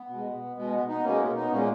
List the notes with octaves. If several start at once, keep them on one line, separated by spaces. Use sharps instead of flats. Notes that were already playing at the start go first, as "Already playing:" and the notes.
Already playing: B3
B2
G#3
B2 G#3 B3
B3
B3 D#4
B2 G#3 A#3 C#4
B3
B3 D#4
A#2 G#3 A#3 C#4